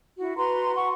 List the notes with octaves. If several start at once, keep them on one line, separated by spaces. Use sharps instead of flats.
E4 F#4
F#4 B4 A#5 C6
F#5 C#6